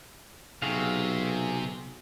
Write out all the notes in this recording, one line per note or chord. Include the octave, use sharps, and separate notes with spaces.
B1 C3 F#4 G#4 F5